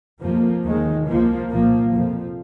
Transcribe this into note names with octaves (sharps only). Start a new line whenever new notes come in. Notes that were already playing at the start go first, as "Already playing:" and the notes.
F2 C3 F3 A#3
D#2 D#3 G#3
C2 C3 F3 A#3
C2 A#2 F3 A#3
F2 C3 F3